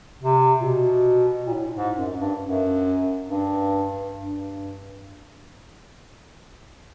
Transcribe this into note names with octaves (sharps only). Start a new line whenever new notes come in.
C3
A#2
B2
A#2
A2
G#2
F#2
G2
F#2
G2
G2